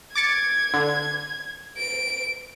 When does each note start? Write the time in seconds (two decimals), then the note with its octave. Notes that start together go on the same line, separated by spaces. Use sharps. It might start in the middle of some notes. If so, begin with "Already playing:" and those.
0.15 D6 G#6 A6 C#7
0.74 D3
1.77 D7